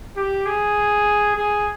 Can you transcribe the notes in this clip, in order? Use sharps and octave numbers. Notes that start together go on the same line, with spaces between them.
G4
G#4
G#4